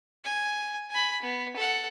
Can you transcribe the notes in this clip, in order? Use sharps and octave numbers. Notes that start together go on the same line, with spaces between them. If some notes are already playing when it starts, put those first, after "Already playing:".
G#5
G#5 B5
B3
A4 F#5